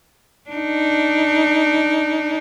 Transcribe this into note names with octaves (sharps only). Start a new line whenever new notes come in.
D4 D#4